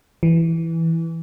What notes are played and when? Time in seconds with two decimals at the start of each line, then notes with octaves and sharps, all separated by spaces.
0.23 E3